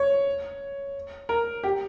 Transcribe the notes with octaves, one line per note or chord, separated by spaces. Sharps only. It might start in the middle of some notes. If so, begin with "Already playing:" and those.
Already playing: C#5
A#4
G4